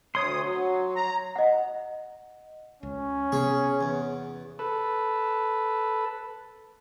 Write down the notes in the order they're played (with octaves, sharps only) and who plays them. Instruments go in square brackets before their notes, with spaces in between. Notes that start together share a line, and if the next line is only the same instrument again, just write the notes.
[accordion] D2 D#6 [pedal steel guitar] C#5 C6
[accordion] F#3
A#5
[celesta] D#5 F#5
[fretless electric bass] C#2 [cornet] C#4
[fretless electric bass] C3 B3 [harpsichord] G#4 C#5
[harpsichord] E2
[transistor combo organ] A4 B4